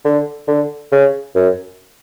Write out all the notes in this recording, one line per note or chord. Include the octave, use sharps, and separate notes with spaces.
D3
D3
C#3
F#2